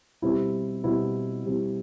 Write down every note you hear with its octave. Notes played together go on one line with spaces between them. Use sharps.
B2 G3 C4 E4
B2 G3 C4 E4
B2 G3 C4 E4